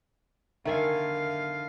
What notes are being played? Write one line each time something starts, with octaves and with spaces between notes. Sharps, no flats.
D3 D#3 A4 A#4 E5 F5 G#5